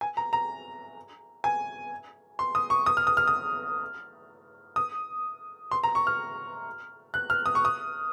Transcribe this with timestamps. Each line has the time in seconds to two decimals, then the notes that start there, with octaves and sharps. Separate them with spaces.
0.01 G#5
0.17 A#5
0.33 A#5
1.44 G#5
2.39 C6
2.55 D#6
2.70 C#6
2.86 D#6
2.97 F6
3.07 D#6
3.17 F6
3.27 D#6
4.76 D#6
5.71 C6
5.83 A#5
5.95 C#6
6.07 F6
7.14 F#6
7.30 F6
7.46 D#6
7.55 C#6
7.65 D#6